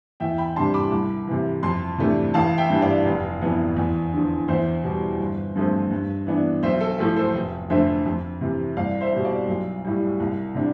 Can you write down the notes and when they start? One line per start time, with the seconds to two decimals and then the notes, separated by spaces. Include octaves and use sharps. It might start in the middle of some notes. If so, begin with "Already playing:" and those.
0.20 E2 E5 G5
0.38 G5 B5
0.56 C3 G3 D4 A5 C6
0.74 B5 D6
0.92 C2
1.27 C3 E3
1.63 F2 A5 C6
1.98 C3 E3 A3 D4
2.34 A1 F5 A5
2.58 E5 G5
2.70 G2 E3 G3
2.82 D5 F5
3.06 F1
3.41 F2 E3 B3
3.77 E2
4.13 D3 F3
4.48 E2 C5 E5
4.84 B2 G3
5.20 G1
5.55 G2 F3 A3 C4
5.91 G2
6.27 E3 B3 D4
6.63 B1 C5 E5
6.80 A4
6.98 A2 F3 A3 A4
7.16 A4 C5
7.34 F1
7.70 F2 D3 A3 C5 E5
8.06 F2
8.41 C3 E3
8.77 C2 D5 F5
9.01 C5 E5
9.13 B2 G3
9.25 D5 F5
9.48 B1
9.84 A2 G3
10.20 C2
10.55 C3 G3 D4